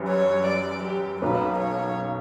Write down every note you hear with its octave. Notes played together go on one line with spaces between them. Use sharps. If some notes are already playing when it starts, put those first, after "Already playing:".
Already playing: F#2 E3 G3 C#4
C#5
D5
G4
B1 B2 A#3 C#4 B4
C#5